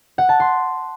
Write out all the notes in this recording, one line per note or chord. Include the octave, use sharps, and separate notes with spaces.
F#5
A5
C6